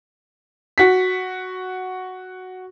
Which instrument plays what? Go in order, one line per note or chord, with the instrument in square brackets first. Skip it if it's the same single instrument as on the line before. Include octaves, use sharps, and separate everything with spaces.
[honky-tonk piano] F#4 B6